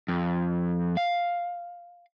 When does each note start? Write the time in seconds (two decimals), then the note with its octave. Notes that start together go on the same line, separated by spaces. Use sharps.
0.08 F2
0.97 F5